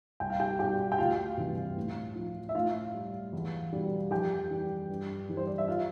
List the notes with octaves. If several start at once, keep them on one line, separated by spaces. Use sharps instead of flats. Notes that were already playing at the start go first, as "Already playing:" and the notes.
C2 G5
F5
G4 G5
B2 G3 G4 G5
G5
D2 F4 F5
C3 E3 G3
A2
F3
E5
A2 F4 F5
G3
E2
B2 G3
F2 G4 G5
E3 G3
G2
E3 G3
C5
D5
E5
F4 F5